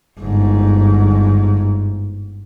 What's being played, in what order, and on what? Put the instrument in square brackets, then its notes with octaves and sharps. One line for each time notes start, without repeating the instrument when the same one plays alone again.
[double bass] G1 G#2